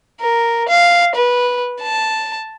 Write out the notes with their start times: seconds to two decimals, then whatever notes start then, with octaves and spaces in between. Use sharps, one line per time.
0.20 A#4
0.69 F5
1.16 B4
1.81 A5